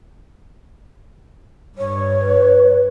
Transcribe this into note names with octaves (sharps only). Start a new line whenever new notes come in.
G2 C#5
B4